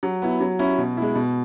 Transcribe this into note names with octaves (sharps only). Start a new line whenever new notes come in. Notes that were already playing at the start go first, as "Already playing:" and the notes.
F#3
B3 E4
F#3
C#4 E4
B2
G#3 E4
B2